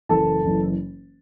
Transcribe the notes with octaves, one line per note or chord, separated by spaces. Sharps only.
F#1 F#2 E3 A4 A5
F#1 E3